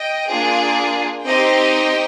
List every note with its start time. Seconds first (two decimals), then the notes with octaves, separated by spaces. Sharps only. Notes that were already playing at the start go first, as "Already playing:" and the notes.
Already playing: D#5 G5
0.28 A#3 D4 F4 G#4
1.25 C4 D#4 G4 D#5 G5